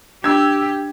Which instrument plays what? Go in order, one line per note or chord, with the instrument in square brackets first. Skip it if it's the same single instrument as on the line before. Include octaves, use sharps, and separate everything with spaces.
[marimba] D4 [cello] G4 [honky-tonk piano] E6 G#6